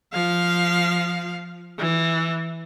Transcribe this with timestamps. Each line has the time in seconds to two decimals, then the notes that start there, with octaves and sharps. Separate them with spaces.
0.13 F3 F5
1.79 E3